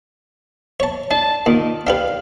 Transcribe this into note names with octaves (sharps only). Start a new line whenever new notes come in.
C#5 A5
D4 A5
A#2 D#3
D4 G4 B4 F5